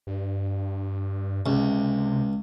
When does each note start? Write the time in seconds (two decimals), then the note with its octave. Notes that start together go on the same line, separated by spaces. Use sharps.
0.07 G2
1.46 C#2 C3